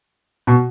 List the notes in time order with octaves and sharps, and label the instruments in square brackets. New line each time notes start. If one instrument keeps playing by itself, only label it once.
[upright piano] B2